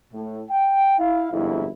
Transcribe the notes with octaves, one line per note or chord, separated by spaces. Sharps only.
A2
G5
E4 F5
G1 F2 G#2 E4